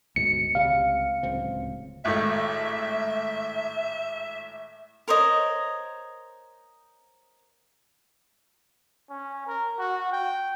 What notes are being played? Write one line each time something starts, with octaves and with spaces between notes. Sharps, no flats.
D2 G#2 B2 C#7
C#2 C3 G3 F5
D1 C#2 C4
G#1 A2 A3 E5
A#4 C5 C#5 D#5
C#4
A#4
F#4
G5